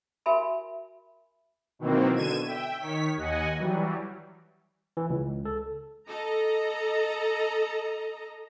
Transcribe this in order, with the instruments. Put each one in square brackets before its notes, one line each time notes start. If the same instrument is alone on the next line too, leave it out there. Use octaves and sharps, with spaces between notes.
[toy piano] F#4 A#4 E5 G#5 B5
[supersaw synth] B2 D#3 E3 F#3 A#3 C4
B2 D3 G#6 D#7 E7
E5 G5
D#3 C#5 B6
D#2 D#5 F#5 G#5
E3 F#3 G3
[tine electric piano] E3
C#2
A4
[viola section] A4 D#5 A#5